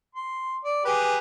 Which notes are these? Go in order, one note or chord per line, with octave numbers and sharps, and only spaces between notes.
C6
D5
G4 G#4 B4